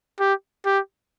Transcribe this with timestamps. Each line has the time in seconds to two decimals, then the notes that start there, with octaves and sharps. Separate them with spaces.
0.20 G4
0.66 G4